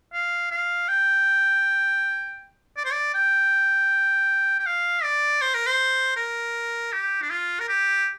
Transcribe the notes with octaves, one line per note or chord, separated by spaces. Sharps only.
F5
F5
G5
D5
C5
D5
G5
G5
F5
D5
C5
A#4
C5
A#4
G4
D4
F4
A#4
G4